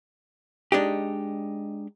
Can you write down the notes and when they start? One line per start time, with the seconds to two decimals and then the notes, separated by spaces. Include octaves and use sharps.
0.72 G#3 D4 D#4 G4